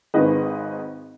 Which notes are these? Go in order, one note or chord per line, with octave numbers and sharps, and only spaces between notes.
G#1 G#2 D#3 B4 D#5